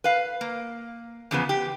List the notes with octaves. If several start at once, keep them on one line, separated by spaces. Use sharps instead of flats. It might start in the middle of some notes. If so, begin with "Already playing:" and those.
B4 F5
A#3
E2 C#3 F3 B3
G4